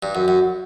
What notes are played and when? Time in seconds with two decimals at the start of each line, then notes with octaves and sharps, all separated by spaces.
0.03 G2
0.15 F#2
0.28 F#2